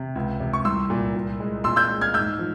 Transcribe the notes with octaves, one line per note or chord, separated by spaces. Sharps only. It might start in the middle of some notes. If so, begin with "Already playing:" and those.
Already playing: C3
C#2
C3
C#6
C2 C6 E6
A#2
A#2
G#3
A#2 C6 E6
E6 G6
G#3
F6 G#6
G#2 E6 G6
F3